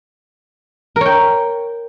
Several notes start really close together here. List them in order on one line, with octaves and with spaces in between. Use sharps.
A#4 C#5 G5